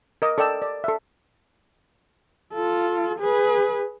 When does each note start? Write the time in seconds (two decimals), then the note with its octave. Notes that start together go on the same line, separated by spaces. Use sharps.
0.22 A#4 D#5 D6
0.38 A4 D5 D#5 G5 E6
0.62 D5
0.84 A4 E5
2.54 F4 A4
3.19 G#4 B4